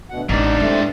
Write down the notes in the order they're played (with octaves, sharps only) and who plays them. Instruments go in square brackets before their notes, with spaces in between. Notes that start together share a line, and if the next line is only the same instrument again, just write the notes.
[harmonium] D2 B2 F#5
[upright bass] A1 [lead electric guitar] G#2 D4 [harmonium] D#4
[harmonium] C3 A3 [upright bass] E4